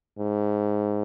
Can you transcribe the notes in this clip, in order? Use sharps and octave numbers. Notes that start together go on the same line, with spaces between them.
G#2